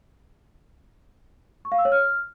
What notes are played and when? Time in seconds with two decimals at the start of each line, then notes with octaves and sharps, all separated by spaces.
1.65 C#6
1.72 F5
1.78 E6
1.85 C#5
1.92 F6